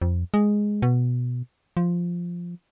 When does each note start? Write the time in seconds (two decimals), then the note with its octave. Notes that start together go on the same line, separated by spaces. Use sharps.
0.02 F2
0.34 G#3
0.82 B2
1.77 F3